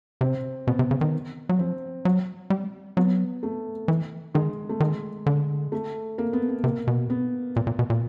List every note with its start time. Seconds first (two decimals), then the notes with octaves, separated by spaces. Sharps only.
0.21 C3 C4
0.67 B2 B3
0.79 C3
0.91 C#3
1.01 D#3
1.49 F#3
1.59 F3 C4
2.05 F#3
2.50 G3
2.97 F#3 B3
3.43 A3
3.88 E3
4.34 D#3 G#3
4.69 A3
4.80 D#3 G#3
5.26 D3
5.72 A3
6.18 A#3
6.33 B3
6.49 B3
6.64 C3 A#3
6.87 B2
7.10 B3
7.56 A#2
7.67 A#2
7.79 B2
7.90 A#2